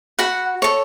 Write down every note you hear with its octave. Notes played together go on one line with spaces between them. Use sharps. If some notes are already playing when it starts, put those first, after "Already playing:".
F#4 F#5 B5
A4 C#5